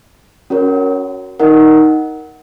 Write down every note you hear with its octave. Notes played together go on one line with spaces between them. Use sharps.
C#4 F#4 A#4 C#5
D#4 A#4 D#5 F#5